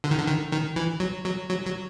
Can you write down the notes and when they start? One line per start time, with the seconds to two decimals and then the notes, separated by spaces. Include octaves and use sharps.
0.04 D3
0.11 D#3
0.18 D3
0.28 D#3
0.52 D#3
0.76 E3
1.00 F#3
1.25 F#3
1.49 F#3
1.65 F#3